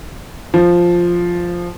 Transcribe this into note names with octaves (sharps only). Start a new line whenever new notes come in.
F3